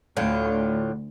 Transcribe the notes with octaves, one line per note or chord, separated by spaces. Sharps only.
D2 A2 D3 F4